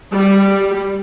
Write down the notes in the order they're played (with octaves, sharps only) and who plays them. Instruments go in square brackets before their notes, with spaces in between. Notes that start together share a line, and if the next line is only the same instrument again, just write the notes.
[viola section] G3